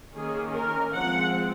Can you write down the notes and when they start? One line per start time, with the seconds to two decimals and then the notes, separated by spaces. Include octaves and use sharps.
0.14 D#3 A#3 C#4 G#4
0.53 A#4
0.92 F3 G#3 C4 F#5